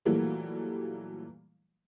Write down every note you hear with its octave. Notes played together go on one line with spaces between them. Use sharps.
A#2 E3 F#3 G3 A3 A#3